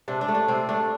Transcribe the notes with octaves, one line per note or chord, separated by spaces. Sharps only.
C3 D4
D4
A3
D4
C3 C4
A3 D4